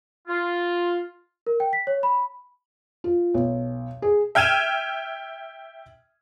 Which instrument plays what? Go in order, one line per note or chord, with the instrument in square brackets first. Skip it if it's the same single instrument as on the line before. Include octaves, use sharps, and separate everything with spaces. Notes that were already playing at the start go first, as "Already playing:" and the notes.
[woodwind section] F4
[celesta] A#4
G5
B6
C#5
B5
[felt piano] F4
B1
G#4
[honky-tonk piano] E5 G5 F6 G#6 D#7 E7